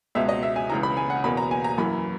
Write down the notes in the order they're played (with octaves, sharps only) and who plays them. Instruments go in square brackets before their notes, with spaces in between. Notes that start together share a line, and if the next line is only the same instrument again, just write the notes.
[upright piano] C#2 B2 G#3 E5
D#5
E5
G#5
C#2 C#3 E3 A#5
B5
G#5
F#5
E2 B2 A#3 B5
A#5
G#5
A#5
F#2 E3 A#3 B5